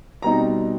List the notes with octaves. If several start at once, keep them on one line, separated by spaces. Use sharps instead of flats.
B2 G3 C4 D#4 A#5